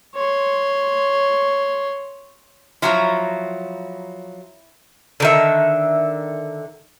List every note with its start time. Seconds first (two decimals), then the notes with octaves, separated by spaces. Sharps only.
0.15 C#5 C6
2.82 F3 F#3 E4 A#5 C#6
5.20 D3 D#3 E5